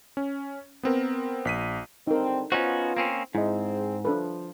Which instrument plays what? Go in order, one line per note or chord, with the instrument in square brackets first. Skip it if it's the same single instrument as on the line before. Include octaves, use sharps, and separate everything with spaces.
[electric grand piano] C#4
B3 C4 A#4
A#1 B6 D#7
[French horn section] D3 G3 C4 [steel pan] D#4 A#4
[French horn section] B3 F4 [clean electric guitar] C#4 D#4 F#4 [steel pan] C5
[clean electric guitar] A#3 C4 C#4
[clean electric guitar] G#2 [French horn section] C4 G#4 [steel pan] E4 D#5
[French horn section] F3 [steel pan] D4 A4 B4